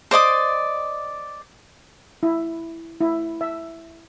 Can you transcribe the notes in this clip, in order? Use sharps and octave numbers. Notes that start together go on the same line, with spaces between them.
C5 D5 D#5 D6
E4
E4
E5